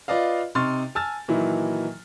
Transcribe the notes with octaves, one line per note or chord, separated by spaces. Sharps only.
F4 B4 D5 D#5 F5
C3 D#4 C6 C#6 F6 A6
G#5 A5 E6 F6 A6
A#2 D#3 E3 F#3 D#4 E4